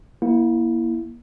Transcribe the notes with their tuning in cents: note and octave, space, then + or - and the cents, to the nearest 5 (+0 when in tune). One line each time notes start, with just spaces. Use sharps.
A#3 +30 E4 +0